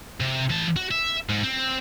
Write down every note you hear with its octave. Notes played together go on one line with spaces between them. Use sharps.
C3
E3 A5
F#4
E5
G#2
C4